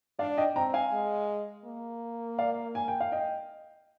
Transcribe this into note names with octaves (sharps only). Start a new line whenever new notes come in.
D4 D5 F5
D#5 G5
C4 G5 A#5
F5 G#5
G#3
A#3
D5 F5
G#5
G5
F5
D#5 G5